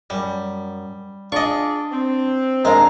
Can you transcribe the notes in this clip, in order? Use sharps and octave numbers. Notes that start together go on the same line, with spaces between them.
F#2 G3
D4 F4 G#4 D5 D#5 C#6
C4
D#2 G#3 C4 D4 C5 F5 A#5